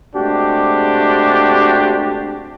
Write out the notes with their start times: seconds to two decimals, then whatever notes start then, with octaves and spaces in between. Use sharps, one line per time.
0.15 C3 G#3 A3 D4 F#4 G4